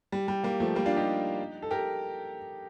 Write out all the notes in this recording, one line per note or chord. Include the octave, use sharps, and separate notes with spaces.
G3
G3
G3 A#3
F3 A3
G3 A#3
D4 F4
D#4 G4
A4
G4 A#4